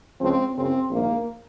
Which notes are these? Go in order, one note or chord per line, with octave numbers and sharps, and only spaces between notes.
C#2 C#3 F3 C4
F#1 F#2 C#3 C4
A#1 G#2 D#3 A#3